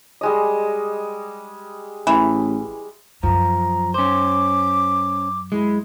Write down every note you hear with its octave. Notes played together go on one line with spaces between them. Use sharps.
G3 G#3 D#5
A1 E3
F#2 F3 A#5
C#4 C5 D6
G#3 E4